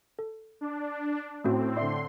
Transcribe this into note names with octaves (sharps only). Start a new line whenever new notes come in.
A4
D4
A2 A3 C4 C#4 F#4
D3 E4 D5 E5 C6